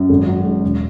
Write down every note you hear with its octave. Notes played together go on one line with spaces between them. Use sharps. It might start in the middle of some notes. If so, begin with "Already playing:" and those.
Already playing: F#2
G#1
F#3
G#2
E1